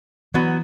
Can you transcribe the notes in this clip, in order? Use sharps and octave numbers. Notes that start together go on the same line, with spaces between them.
E3 F#3 B3 F#4